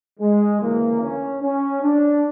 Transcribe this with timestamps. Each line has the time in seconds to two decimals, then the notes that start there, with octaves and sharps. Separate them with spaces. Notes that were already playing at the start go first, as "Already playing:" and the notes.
0.20 G#3
0.61 D2 C#3 E3 A#3
1.01 C#4
1.42 C#4
1.82 D4